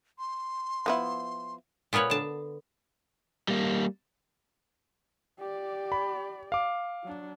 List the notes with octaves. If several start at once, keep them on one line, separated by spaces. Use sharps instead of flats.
C6
F3 B3 E4
A#2 B3 A#4 B4 C#5
D3 A5
G3 A#3
G4 D5
B5
F5 D6
F#3 D4